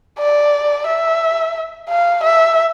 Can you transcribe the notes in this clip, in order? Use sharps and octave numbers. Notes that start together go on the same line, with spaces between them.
D5
E5
F5
E5